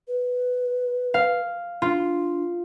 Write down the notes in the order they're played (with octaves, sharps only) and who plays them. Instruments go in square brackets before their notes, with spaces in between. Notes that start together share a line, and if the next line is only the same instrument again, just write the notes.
[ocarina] B4
[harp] F5
[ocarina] D4 [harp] F4